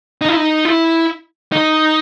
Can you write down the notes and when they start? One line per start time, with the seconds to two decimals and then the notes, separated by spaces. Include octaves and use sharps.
0.21 D#4
0.28 E4
0.37 D#4
0.65 E4
1.52 D#4